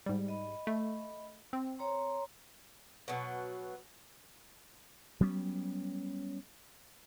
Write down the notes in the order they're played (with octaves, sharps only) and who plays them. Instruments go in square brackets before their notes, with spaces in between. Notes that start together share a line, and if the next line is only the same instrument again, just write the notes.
[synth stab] G#2 G3
[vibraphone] D#5 B5
[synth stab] A3
C4
[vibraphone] C#5 A#5 C6
[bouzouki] B2 F#3
[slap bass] F#3 G3 B3 C#4